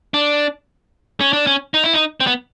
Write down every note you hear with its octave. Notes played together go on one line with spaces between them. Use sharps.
D4
C#4
D4
C#4
D#4
E4
D#4
C4
B3